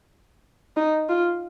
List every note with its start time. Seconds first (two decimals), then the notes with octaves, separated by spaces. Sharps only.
0.77 D#4
1.09 F4